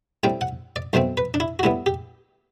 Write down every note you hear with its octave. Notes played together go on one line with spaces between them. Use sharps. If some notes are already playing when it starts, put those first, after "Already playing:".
A2 G3 C4 G5
F#5
D5
B1 B2 A3 C4 C5
B4
D4
E4
F#4
A2 G3 B3 E4
G4